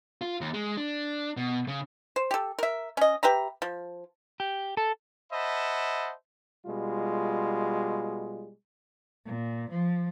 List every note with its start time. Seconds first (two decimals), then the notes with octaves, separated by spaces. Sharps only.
0.22 F4
0.41 D#2
0.54 G#3
0.77 D4
1.37 B2
1.68 C#3
2.16 C5
2.31 G4 A4
2.59 A#4 E5
2.97 C#4 D#5
3.23 G4 B4 E5 A#5
3.62 F3
4.40 G4
4.77 A4
5.32 C5 D#5 E5 F#5 A5 B5
6.66 B2 G3 G#3 F4
9.26 A#2
9.70 F3